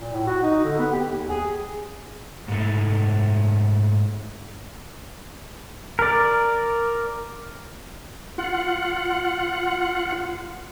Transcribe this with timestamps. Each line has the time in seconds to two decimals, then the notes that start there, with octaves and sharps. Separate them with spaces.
0.01 A#2
0.13 A2
0.27 F#4
0.43 D#4
0.64 D3
0.79 B3
0.92 G4
1.10 D#2
1.29 G#4
2.48 G#2 A3
5.99 A#4 D5
8.38 F4 F#5